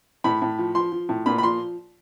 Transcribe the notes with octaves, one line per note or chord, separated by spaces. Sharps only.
A2 B5
A2
F3
F3 C6
F3
A2
A#2 B5
B5
F3 C6